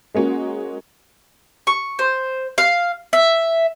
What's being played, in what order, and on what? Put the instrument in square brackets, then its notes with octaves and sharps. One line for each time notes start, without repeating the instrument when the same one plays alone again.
[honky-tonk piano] G#3 A#3 C#4 F#4
[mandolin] C#6
C5
F5
E5